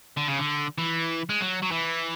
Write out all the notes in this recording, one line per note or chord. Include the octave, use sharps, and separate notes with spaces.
D3
C#3
D3
E3
G#3
F#3
F#3
E3